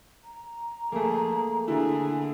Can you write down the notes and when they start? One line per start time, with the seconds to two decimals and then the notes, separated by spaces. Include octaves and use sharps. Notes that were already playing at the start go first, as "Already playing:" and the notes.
0.24 A#5
0.92 A3 A#3 G#4
1.68 D3 E4 G#4